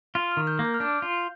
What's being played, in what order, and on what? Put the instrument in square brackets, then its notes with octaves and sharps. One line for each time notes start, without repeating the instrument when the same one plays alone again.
[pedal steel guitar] F4 [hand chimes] F6
[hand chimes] F6
[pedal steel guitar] D#3
[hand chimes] G6
[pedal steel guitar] A#3
[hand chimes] G6
F6
[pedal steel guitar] D4 [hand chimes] G6
[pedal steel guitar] F4